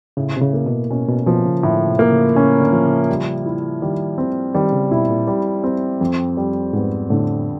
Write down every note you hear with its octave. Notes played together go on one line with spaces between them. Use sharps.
A2 C#3
C3
C#3
A#3
B2
B2 C#4
B2
B2 F3
C#3
A2 D3
C3
A#3
C#3
C#3 C#4
D3
F3
C#3
G3
E4
D#3 G3
C4
D#3 G3
C#3
B2 E4
A#2
G3
C4
F2
G3
G#2 B3
A2 D3